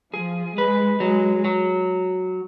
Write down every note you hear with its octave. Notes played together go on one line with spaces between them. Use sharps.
F3 G#4
G#3 B4
F#3 G#3
F#3